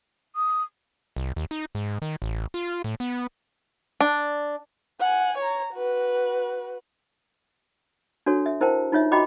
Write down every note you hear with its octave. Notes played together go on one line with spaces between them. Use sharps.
D#6
C2
D#2
D#4
G#2
D#3
A1
F4
A2
B3
D4
F#5 G#5
C#5 A#5
F#4 B4
D4 F#4 A4 C#5
E5
E4 A#4 C5 G5 A5
D#4 F4 C#5 E5
F#4 D#5 G5 A#5 B5 D6